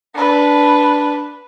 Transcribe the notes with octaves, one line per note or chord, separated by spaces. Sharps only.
D4 B4